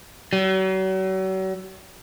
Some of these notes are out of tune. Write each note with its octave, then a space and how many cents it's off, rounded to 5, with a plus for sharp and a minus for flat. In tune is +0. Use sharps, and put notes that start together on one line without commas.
F#3 +40